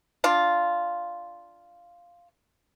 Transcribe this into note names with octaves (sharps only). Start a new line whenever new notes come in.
D4 F4